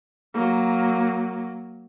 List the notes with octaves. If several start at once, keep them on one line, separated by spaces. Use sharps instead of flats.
F#3 A#3